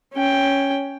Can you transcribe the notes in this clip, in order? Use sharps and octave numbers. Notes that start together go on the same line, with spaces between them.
C#4 G5